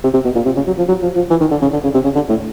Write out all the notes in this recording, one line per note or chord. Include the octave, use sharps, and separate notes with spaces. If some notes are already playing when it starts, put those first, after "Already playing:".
C3
C3
B2
A#2
C3
C#3
F#3
F3
F#3
F3
F3
E3
D#3
D3
C#3
D3
C#3
C3
C#3
D3
A2